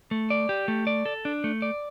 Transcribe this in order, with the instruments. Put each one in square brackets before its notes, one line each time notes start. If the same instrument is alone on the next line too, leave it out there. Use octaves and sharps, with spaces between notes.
[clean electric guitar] A3
D5
G4
A3
D5
A4
D4
A3
D5